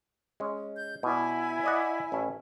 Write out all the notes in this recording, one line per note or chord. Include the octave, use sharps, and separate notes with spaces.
G#3 C#4
G6
B2 E4 D5 G#5
D5 D#5 F#5
A1 C#4 A4